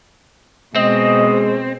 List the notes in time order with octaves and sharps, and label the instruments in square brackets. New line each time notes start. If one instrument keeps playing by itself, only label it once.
[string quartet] B2 [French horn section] G#3 [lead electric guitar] C4 [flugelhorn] D#5